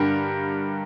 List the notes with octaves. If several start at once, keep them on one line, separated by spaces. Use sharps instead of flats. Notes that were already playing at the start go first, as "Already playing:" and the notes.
Already playing: G2 D3 G4 A#4